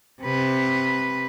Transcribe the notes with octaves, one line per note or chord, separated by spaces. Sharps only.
C3 B4